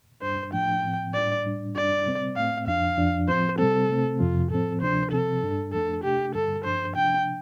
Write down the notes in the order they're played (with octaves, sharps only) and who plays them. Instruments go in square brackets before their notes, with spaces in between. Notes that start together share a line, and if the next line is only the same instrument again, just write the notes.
[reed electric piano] G2 G3 D4 [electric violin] C5
[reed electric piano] A2 F3 A3 D4 [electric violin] G5
[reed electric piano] A2 F3 C4
[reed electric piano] A2 G3 D4 [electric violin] D5
[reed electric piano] A2 G3 D4
[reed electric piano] G2 G3 D4 [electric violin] D5
[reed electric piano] C3 G3 C4
[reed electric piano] A2 A3 C4 [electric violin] F5
[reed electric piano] F2 F3 D4 [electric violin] F5
[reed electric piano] F2 F3 D4
[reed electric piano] A2 F3 C4 [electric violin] C5
[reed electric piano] C3 G3 C4 [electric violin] A4
[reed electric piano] C3 A3 C4
[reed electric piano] F2 C3 F3 [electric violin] F4
[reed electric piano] A2 F3 C4 [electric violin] A4
[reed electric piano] D2 C3 F3 D4 [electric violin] C5
[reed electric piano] C3 F3 C4 [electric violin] A4
[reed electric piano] G2 G3 D4
[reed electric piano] F2 F3 A3 D4 [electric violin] A4
[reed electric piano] C3 A3 D4 [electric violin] G4
[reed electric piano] G2 D3 G3 [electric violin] A4
[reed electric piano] G2 F3 D4 [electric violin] C5
[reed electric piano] C3 F3 D4 [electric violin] G5